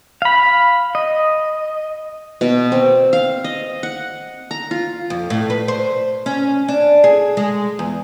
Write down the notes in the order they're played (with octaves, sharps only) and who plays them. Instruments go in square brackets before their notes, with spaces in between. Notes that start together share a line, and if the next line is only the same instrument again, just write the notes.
[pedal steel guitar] F5 B5
D#5
[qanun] B2
C4
F5
D#5
F#5
A#5
F4
[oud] F2
A2
B4
C5
C#4
D4
G#4
G#3
E2